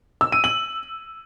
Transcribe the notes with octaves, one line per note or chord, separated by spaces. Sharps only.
E6
D#7
F#7